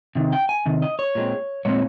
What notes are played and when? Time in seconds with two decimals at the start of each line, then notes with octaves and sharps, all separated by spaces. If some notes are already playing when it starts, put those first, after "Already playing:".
0.15 C3 D#3
0.32 G5
0.49 G#5
0.66 C3 D#3
0.82 D#5
0.99 C#5
1.15 A#2 G#3 C4
1.65 A#2 G#3 C4 C#5